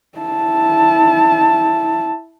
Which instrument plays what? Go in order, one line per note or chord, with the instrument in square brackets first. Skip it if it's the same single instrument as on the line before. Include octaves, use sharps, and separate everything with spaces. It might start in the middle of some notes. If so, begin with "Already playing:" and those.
[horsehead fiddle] E4 A5